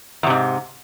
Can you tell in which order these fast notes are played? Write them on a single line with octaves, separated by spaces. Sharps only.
E2 C3 G#2